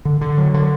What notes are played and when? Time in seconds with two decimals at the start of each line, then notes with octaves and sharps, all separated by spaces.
0.05 D3
0.21 D3
0.38 F#3
0.54 D3